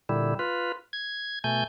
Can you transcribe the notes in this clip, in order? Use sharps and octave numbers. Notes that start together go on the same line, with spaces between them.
A#2 D3 G3 E4
F4 B4
G#6
B2 A3 G#5 G6